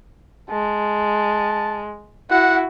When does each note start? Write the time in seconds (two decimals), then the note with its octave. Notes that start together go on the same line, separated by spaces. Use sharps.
0.50 G#3 A5
2.30 E4 F#4 F#5